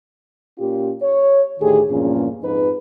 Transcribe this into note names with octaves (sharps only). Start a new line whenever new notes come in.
A#2 C#4 F4 G4
C#5
D2 A2 D#3 G4 G#4
E2 G2 A#2 F3 A#3 C#4
F2 G#2 D#4 B4